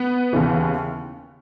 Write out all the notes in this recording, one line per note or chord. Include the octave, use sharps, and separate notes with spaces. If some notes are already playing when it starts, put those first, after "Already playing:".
Already playing: B3
D#2 C#3 E3